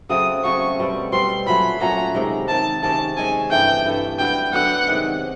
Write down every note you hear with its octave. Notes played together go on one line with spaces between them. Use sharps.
C#3 F#3 A3 C4 D#6
C#3 F#3 A3 C4 C#6
B2 G3 C4
B2 G3 C4 C6
A#2 F#3 A3 C#4 B5
A#2 F#3 A3 C#4 A#5
C3 D#3 G#3
C3 D#3 G#3 A5
C3 D#3 G#3 C#4 A5
C3 D#3 G#3 C#4 G#5
G2 E3 A3 G5
G2 E3 A3
D3 F#3 B3 G5
D3 F#3 B3 F#5
C3 D#3 G#3